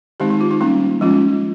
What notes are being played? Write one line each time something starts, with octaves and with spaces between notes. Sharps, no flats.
D#3 G#3 C4 D#4 G4
D#4
F4
D#4
G3 A#3 C#4 D#4
F3 G#3 C#4 F4